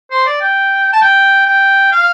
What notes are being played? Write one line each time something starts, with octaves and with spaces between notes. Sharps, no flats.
C5
D5
G5
A5
G5
G5
F5